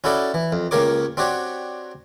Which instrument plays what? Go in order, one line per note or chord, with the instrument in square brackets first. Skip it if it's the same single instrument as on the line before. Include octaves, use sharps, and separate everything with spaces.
[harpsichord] C#4 E4 F#4 A4 D5
E3
F2
C#2 A#3 G4 A#4 C#5 D6
C4 D4 F#4 G4 C#5